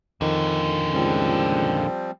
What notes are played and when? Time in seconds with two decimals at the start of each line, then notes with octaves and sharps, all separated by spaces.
0.21 F2 A#2 D3 D#3
0.93 C#2 F3 G3 C4